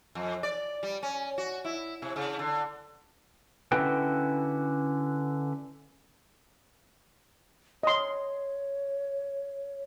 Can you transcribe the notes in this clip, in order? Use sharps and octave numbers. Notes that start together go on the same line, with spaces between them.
F2
D5
G3
C#4
F#4
E4
C3
C#3
D3
D3 C#4 E4 F#4 B4 G5
C#5 D#5 C6